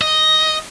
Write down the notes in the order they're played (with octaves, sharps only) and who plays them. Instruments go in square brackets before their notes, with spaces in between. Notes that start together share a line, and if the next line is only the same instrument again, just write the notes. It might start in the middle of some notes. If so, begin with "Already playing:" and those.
[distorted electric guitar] D#5